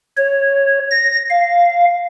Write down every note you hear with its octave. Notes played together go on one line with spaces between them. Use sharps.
C#5
A#6
F5